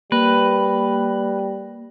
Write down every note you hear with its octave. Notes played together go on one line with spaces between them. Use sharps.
G3 A#3 B4